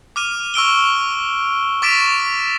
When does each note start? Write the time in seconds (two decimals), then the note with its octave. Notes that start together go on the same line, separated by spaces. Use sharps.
0.16 D6 F6 D#7
0.54 C#6 E6 D7 G7
1.82 C#6 D6 A6 B6 D7 E7